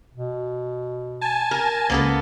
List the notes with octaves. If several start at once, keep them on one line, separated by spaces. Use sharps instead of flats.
B2
G#5 A5
A#4
C#2 A#3 B3 A4